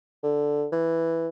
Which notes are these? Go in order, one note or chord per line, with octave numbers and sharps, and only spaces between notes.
D3
E3